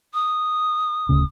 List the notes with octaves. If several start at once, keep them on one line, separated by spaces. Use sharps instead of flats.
D#6
D1 A2 C#3